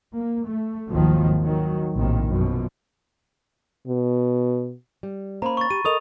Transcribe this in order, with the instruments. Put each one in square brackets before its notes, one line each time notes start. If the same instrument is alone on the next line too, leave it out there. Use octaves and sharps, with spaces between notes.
[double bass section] A#3
A3
G#1 D#2 D#3 F3 F#3
D#3 F#3
A#1 A2 C3 D#3
F#2 B2 F3
[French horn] B2
[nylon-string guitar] G3
[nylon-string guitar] A#3 C#4 C5 [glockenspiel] A#5 B5
[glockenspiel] C#6 A6
[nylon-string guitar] G4 [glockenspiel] D#7
[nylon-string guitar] A4 A#4 D#5 [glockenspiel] C#6 D#6 F7